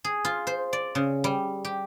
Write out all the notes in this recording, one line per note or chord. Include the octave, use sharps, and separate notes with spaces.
G#4
F4
C5
D5
C#3
G3
G4